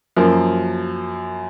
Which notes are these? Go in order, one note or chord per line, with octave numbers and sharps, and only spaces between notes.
F#2 F3 A#3